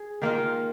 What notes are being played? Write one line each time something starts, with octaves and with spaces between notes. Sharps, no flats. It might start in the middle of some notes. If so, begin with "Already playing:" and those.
Already playing: G#4
D#3 A#3 F4